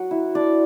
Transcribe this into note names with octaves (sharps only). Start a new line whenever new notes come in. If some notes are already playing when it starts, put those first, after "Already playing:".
Already playing: F#3 F#4
E4
D4 D5